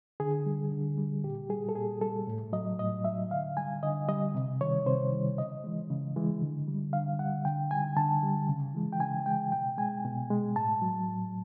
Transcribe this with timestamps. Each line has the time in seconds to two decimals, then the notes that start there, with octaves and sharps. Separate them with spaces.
0.20 D3 G#4
0.46 G3
0.72 D3
0.98 G3
1.24 A#2 G4
1.49 G3 G#4
1.69 A4
1.76 A#2 G#4
2.01 G3 A4
2.27 A2
2.53 F#3 D#5
2.79 A2 D#5
3.04 F#3 E5
3.31 D3 F5
3.57 G3 G#5
3.83 D3 D#5
4.09 G3 D#5
4.35 C3
4.61 D#3 G3 C#5
4.86 C3 C5
5.12 D#3 G3
5.38 C#3 D#5
5.64 E3 G#3
5.90 C#3
6.16 E3 G#3
6.42 D3
6.67 G3
6.93 D3 F5
7.19 G3 F#5
7.45 D3 G5
7.71 G3 G#5
7.96 D3 A5
8.23 G3
8.49 C#3
8.74 E3 G#3
8.92 G5
9.00 C#3 G#5
9.26 E3 G#3 G5
9.52 B2 G5
9.78 G#3 G#5
10.05 B2
10.30 G#3
10.56 A2 A5
10.82 F#3
11.08 A2